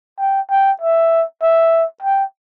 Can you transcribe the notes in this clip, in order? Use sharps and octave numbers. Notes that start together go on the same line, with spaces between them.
G5
G5
E5
E5
G5